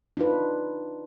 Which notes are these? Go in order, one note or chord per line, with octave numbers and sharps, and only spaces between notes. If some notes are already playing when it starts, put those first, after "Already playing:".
D4 D#4 F4 B4